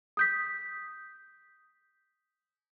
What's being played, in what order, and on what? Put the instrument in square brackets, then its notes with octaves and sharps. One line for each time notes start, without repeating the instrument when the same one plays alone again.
[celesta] D#6 G6 B6